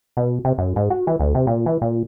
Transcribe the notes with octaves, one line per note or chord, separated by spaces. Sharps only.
B2
C3
F#2
G#2
F#4
E3
D2
C3
A#2
E3
A#2